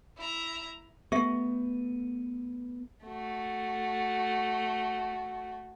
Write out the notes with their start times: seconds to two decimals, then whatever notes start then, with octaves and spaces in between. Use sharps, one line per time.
0.17 E4 A#5
1.12 A3 B3 G4 E5
3.05 A3 F#4